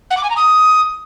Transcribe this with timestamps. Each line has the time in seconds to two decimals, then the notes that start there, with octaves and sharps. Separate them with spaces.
0.10 F#5
0.17 D6
0.23 G#5
0.30 A#5
0.36 D#6